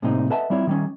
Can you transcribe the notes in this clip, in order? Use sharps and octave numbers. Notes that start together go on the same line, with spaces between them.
A2 C3 G3 A#3 C4 D#4
A4 B4 D#5 E5 F#5 A5
G3 C4 E4 F4 C#5
D#3 G3 C#4